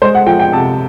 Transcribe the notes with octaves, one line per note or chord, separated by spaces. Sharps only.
G#3 C5
F#5
F3 G5
G5
C3 A5